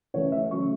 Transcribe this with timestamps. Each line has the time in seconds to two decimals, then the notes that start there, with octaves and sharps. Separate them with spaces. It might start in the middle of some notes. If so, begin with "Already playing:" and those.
0.14 C#3 E3 A3 C#5
0.32 E5
0.51 C#3 F#3 A3 C#6